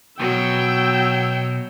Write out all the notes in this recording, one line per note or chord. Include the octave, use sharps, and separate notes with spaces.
B2 F#3 G5 E6